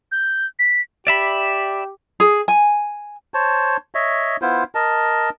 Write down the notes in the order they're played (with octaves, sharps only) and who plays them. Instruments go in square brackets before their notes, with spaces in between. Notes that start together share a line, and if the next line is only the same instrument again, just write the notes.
[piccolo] G6
B6
[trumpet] G4 [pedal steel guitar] D5 E5 B5
[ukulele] G#4
G#5
[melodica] C5 C#5 A5
C#5 D#5 E5
B3 E4 F4 C5
A#4 D#5 A5